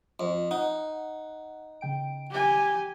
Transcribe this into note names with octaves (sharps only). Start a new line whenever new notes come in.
F2
D#4 F#5
C#3 G5 D7
G4 G#5